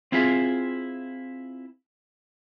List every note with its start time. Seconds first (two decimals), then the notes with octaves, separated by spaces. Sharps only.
0.12 C4 E4 F4 G#4 E5